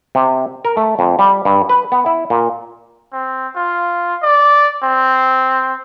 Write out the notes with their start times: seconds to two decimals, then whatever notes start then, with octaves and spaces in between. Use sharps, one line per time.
0.15 C3
0.65 A#4
0.77 A3
0.99 F2
1.19 G3
1.45 G2
1.69 B4
1.92 B3
2.06 E4
2.30 A#2
3.13 C4
3.56 F4
4.23 D5
4.83 C4